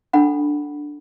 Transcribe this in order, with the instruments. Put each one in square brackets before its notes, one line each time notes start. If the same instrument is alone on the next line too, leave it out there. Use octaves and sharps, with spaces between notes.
[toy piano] D4 A4 F#5 B5